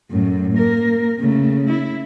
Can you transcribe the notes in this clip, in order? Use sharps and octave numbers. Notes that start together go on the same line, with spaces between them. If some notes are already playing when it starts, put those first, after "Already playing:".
F#2 A2
A#3 A#4
C#3 A3
E4